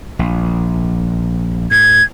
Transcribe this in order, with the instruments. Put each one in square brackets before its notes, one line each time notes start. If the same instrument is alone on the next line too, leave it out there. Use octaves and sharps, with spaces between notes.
[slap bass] A#1
[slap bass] A2 [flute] G#6